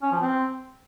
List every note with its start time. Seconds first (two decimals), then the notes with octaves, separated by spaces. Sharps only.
0.02 C#4
0.12 F3
0.21 C4